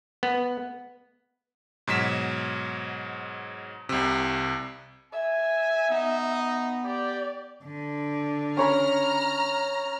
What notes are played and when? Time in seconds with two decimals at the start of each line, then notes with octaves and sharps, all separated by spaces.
0.23 B3
1.87 G#2 B2 F#3 B6 E7
3.89 C2 C3
5.13 E5 G#5
5.90 B3 D#4
6.85 G4 D5
7.64 D3
8.57 C#4 C#5 A#5 B5 F6